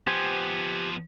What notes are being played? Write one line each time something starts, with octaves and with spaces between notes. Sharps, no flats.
F3 B3 G4 C5 G#5